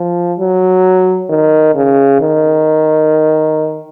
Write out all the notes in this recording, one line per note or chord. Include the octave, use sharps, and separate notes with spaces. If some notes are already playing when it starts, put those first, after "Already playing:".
Already playing: F3
F#3
D#3
C#3
D#3